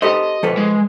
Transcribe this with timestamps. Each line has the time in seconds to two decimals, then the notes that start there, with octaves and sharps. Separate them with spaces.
0.02 G4 A4 C5 D#5
0.43 F3 A4 B4
0.57 G#3